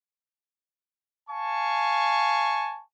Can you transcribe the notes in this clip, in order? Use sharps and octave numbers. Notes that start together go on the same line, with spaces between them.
F5 G#5 A5 C#6